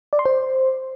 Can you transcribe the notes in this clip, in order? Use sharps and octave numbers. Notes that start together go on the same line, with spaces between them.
D5
C6
C5